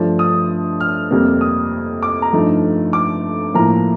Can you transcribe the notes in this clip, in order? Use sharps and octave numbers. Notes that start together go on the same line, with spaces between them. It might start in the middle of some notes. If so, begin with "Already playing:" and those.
Already playing: G2 F3 A3 D4
D#6
F6
F2 C3 G3 A#3
D#6
D6
A#5
G2 F3 A3 D#4
D6
A2 F3 A#3 A#5